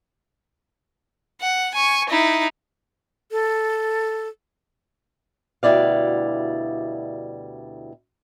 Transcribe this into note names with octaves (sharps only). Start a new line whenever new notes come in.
F#5
G#5 C#6
D#4 E4
A4
D2 B2 G3 E4 D5 F5